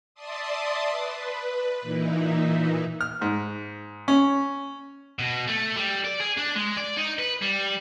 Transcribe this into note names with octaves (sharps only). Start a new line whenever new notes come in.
D5 E5 A5 C6 D#6
B4
A#2 E3 D#4 E4
F6
G#2
C#4
B2
A3
G3
D5
G#4
D4
G#3
D5
D#4
B4
G3